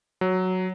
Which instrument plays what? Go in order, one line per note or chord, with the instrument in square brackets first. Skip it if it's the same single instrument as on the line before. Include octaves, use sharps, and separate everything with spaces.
[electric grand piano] F#3